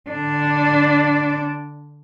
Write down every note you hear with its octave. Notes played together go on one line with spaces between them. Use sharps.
D3 D4